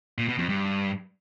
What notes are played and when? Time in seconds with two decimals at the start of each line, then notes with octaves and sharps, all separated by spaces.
0.18 A#2
0.28 B2
0.39 F2
0.49 G2